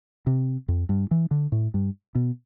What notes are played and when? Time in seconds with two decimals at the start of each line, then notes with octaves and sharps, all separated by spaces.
0.27 C3
0.68 F2
0.89 G2
1.11 E3
1.31 D3
1.52 A2
1.74 G2
2.15 B2